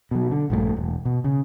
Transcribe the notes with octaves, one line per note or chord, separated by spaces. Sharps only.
B2 F#3
D3
A#1 G2 E3 A3
E1
B2
C#3